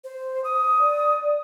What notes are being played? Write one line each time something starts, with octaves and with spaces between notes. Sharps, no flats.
C5
D#6
D5